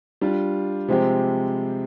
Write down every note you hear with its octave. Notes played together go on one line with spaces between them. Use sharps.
G3 D4 F4
C3 F3 G#3 C4 G4